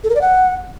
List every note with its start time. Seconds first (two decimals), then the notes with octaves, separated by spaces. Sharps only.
0.04 A4
0.10 A#4
0.15 D5
0.21 F#5